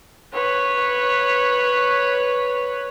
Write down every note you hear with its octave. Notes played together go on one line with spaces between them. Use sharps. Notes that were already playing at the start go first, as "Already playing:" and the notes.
B4 C#5